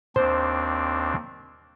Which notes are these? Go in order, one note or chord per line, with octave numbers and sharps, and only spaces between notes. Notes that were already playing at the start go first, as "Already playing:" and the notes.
D#2 C4 D4 C5